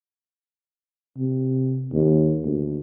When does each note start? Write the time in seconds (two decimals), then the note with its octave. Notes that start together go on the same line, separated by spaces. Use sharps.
1.18 C3
1.93 D#2
2.45 D2